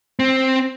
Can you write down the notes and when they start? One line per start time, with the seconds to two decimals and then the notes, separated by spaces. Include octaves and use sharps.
0.19 C4